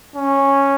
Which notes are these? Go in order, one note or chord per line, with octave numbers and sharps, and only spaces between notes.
C#4